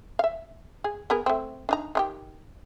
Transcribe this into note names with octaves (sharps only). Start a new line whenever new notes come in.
E5 F5
G#4
B3 G#4 A#4
A3 C4
D4 D#4 A#5
D#3 F4 G4